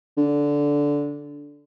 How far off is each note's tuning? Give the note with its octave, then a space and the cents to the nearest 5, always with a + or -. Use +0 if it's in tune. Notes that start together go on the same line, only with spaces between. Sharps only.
D3 -10